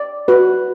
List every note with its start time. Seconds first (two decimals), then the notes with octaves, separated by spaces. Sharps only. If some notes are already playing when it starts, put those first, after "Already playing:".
Already playing: D5
0.28 F#4 B4